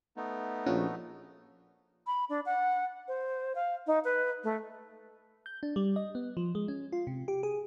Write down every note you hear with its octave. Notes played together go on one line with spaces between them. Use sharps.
A3 B3 D#4
A#1 F3 C#4 F#4
B5
D4
F#5
C5
F5
D#4
B4
A3
G6
D4
G3
D#5
B3
F3
G#3
C#4
F4
C3
G4
G#4